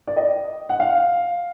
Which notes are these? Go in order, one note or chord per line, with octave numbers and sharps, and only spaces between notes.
D5
D#5
F#5
F5